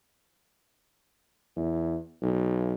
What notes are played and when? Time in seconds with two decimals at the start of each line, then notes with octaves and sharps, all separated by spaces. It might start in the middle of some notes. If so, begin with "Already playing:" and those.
1.56 E2
2.22 B1